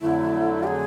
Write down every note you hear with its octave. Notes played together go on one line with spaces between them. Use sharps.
F2 D3 F#3 A3 E4
G4
G#4